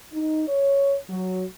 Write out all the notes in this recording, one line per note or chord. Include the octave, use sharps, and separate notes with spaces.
D#4
C#5
F#3